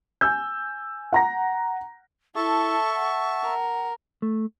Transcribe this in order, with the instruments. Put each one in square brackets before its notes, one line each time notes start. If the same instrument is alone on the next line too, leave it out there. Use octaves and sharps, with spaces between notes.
[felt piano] G#5 E6 G6
F#5 A#5 A#6
[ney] E4 [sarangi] A4 [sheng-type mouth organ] E5 A5 [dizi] C#6
[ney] F#5
[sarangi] A#4
[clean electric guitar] A3